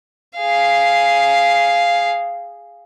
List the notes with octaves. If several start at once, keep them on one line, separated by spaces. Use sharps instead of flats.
G#4 F5